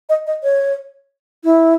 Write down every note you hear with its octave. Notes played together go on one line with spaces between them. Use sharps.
D#5
D#5
C#5
E4